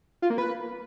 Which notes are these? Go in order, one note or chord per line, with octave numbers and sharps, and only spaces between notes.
F4
A#3
B4